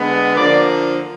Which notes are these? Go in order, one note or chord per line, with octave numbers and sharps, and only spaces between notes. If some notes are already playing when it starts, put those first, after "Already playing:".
Already playing: D3 G#3 B3
D3 F3 A#3 D5